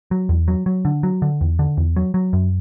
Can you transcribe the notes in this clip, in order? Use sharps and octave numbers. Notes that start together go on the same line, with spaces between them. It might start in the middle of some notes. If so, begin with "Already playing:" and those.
F#3
E2
F#3
F#3
D3
F#3
D3
E2
D3
E2
F#3
F#3
F#2